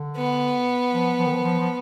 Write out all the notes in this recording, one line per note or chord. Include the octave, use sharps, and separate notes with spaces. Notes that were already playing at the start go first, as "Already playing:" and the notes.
Already playing: D3
B3
F3
F3
D#3
F3
F3
F3